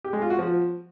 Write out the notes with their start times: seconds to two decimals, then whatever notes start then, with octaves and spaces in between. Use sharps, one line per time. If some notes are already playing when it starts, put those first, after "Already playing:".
0.04 G4
0.13 G#3
0.22 F4
0.30 F#4
0.39 F3